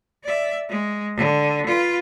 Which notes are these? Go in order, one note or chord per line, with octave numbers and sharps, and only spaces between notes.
D5 E5
G#3
D3
F4 B4